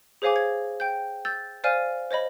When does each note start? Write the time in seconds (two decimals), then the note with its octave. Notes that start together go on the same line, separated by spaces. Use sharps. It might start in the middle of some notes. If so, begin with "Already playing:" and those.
0.22 G#4 C5 C#5 F5 G#5 D6
0.36 G#6
0.80 G5 G6
1.25 E6 G6 A6
1.64 C5 D5 F5 G#5 F6 D#7
2.11 C5 C#5 D#5 B5